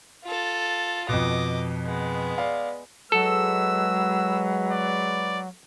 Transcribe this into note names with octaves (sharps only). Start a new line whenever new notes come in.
F4 A4
F2 B2 D#5 D6
G#3 B3
D5 F5
F#3 G#3 A4 B4 E6
D5